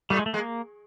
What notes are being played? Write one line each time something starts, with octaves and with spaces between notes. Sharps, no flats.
A2 G3 A3
G#3
A3
G#3 A#3